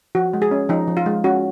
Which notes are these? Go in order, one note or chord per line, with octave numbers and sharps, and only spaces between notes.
F3 F#4
G#3
G#4
C#4
F3 D#4
F3
F4
G#3
C#4 F#4